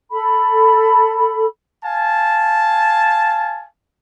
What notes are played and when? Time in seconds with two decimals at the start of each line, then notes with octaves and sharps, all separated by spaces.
0.11 A4 B5
1.84 F5 G#5 A5